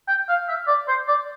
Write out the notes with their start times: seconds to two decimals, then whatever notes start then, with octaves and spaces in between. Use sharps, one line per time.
0.08 G5
0.29 F5
0.49 E5
0.68 D5
0.88 C5
1.08 D5